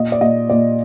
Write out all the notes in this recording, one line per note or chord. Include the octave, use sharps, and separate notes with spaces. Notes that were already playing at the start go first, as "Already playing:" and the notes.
Already playing: A#2 D#5
D5
A#2 D#5
A#2 D5